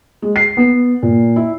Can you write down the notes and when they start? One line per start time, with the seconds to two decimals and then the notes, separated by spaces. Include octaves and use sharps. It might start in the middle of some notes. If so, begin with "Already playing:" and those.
0.22 G#3
0.36 C7
0.57 B3
1.03 A#2
1.36 E4